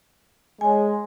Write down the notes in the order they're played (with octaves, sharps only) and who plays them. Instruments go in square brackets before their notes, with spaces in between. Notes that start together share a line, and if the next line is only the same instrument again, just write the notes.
[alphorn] G#3 [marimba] C#5 G#5